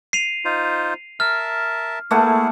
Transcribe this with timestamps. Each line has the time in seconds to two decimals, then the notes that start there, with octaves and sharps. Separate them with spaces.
0.13 C7 D#7 F7
0.45 D#4 F4 C5
1.20 A#4 E5 A5 F6
2.11 A3 A#3 E4 G#4 F#5